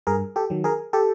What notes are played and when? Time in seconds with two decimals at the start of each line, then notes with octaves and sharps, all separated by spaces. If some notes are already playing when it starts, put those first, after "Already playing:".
0.07 G2 G#4 A#4
0.36 G4 A4
0.50 D#3 F#3
0.64 G#4 A#4
0.93 G4 A4